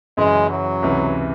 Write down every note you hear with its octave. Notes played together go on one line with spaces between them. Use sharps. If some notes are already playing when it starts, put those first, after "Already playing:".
F#2 C#3 E3 G#3
F#3
C#2 C3 E3